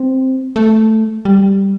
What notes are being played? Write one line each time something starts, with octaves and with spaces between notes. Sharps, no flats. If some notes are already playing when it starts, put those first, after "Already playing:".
Already playing: C4
A3
G3